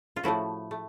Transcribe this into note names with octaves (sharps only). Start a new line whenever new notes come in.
F4
A2 F3 A3 E4 F#4
A3